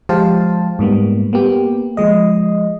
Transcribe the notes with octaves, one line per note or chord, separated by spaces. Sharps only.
F3 G#3 G4 C5 F5 A5
G#2 G3 A#3 B3
A#3 B3 G4
F3 G#3 D#5